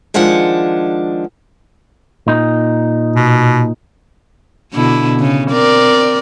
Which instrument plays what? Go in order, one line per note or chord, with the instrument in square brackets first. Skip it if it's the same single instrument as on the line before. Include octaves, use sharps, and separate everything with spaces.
[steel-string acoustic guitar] D#3 F3 G#3 D4 F#5
[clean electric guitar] A#2 D#4
[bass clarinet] B2
[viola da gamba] B2 D3 E4
C#3
C4 A#4 D5